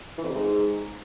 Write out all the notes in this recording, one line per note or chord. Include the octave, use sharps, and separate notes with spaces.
E3
F2
C3
G#2